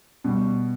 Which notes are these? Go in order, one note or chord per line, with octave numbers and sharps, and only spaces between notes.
B2 G3